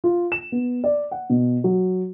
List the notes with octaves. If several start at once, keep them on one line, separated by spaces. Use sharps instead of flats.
F4
E7
B3
D5
F#5
B2
F#3